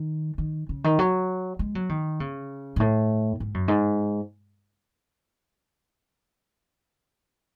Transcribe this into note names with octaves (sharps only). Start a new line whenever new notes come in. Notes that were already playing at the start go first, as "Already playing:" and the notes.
Already playing: D#3
D#3
C#3
D#3
F#3
G#3
F#3
D#3
C#3
G#2
A2
G#2
F#2
G#2